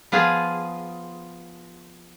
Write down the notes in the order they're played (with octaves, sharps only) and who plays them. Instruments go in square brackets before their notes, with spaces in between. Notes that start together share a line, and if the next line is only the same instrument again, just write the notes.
[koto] F3 B3 F4 G#4